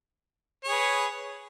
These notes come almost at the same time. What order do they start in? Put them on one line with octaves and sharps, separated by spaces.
C#5 G#4 B4